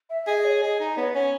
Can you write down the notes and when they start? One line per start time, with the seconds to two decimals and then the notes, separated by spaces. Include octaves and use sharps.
0.10 E5
0.27 G#4 D#5
0.38 D#5
0.45 C#5
0.62 G#4 D#5
0.80 D#4 D#5
0.97 B3 C#5
1.15 C#4 C#5